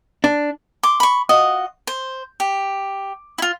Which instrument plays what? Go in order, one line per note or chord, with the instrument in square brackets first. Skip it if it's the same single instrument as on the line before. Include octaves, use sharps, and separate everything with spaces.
[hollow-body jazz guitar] D4
[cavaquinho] C6 D6
B5 C#6
F4 F#4 D#5
C5
G4
E4 F4